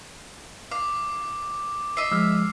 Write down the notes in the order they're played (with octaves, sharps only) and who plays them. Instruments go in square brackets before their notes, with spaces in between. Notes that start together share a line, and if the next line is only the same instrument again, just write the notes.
[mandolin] F5 [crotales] D6
[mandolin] D#5 E5 [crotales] C7
[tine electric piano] F3 G#3 [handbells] E6 F6